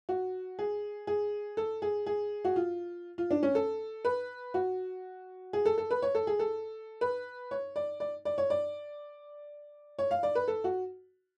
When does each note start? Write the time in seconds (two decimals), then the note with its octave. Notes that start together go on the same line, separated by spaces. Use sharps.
0.09 F#4
0.59 G#4
1.07 G#4
1.57 A4
1.82 G#4
2.06 G#4
2.45 F#4
2.56 F4
3.18 F4
3.31 D4
3.43 C#4
3.55 A4
4.05 B4
4.54 F#4
5.53 G#4
5.66 A4
5.78 A4
5.91 B4
6.02 C#5
6.15 A4
6.27 G#4
6.39 A4
7.01 B4
7.51 C#5
7.76 D5
8.00 D5
8.25 D5
8.38 C#5
8.50 D5
9.99 C#5
10.11 F5
10.23 D5
10.35 B4
10.48 A4
10.64 F#4